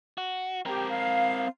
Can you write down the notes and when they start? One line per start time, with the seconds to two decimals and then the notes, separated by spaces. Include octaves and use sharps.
0.18 F#4
0.66 C4 G4 A#4 G5
0.88 F5